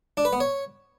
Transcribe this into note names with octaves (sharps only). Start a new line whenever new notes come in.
D4
B4
B3
C#5